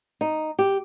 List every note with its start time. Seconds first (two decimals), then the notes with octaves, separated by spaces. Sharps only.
0.21 D#4
0.59 G4